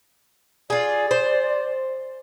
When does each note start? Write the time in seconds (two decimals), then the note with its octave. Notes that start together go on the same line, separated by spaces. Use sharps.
0.70 F4 G#4 D5
1.11 C5